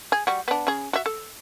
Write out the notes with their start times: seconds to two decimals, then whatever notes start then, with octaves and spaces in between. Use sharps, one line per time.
0.12 G#4
0.27 G3 F#4
0.48 B3 D4
0.67 C#3 G#4
0.93 F#4 E5
1.06 A4